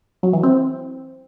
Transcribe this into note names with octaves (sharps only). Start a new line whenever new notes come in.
F#3
E3
C4